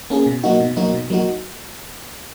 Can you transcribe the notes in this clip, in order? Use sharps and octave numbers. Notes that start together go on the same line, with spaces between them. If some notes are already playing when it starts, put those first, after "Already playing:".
A#3 C#4 G#4
B2
F#3 A#3 D#4 F#4
B2
F#3 A#3 D#4 F#4
B2
F#3 A#3 D#4 F#4